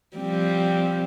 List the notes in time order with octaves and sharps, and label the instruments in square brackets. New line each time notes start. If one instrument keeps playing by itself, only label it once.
[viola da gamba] F3 G3 C4